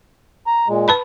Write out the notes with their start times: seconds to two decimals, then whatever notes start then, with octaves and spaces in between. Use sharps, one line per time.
0.47 A#5
0.68 A#2 G#3
0.88 B4 A5 B5